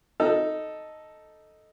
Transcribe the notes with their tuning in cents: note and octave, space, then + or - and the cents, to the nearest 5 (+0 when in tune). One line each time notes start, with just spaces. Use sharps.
D#4 +0 A4 +0